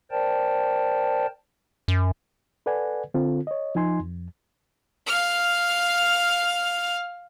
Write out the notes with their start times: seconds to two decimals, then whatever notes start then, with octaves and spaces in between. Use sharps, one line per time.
0.11 A#4 C5 D5 G5 A5
1.88 F#2
2.66 A4 B4 D5 F#5 G#5
3.14 D3 C4 F4 A4
3.47 C#5 D#5
3.75 F3 D#4 G#5 C6
4.00 F2
5.07 F5 F6